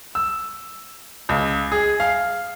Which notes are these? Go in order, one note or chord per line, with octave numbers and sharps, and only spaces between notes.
E6
C#2
G#4
F5